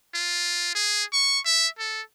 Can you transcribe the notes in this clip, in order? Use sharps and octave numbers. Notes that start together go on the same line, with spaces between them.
F4
G#4
C#6
E5
A4